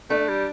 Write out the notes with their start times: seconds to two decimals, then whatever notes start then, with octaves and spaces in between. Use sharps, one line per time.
0.10 A3 D4
0.29 G3